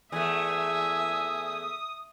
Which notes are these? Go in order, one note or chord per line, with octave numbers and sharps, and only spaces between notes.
E2 A3 E5 G#5 D#6